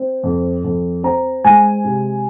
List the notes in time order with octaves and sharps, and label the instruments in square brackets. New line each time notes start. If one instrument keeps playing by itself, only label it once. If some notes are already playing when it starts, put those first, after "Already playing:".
Already playing: [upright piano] C4
F2
F2
C4 A#5
G#3 G#5
C3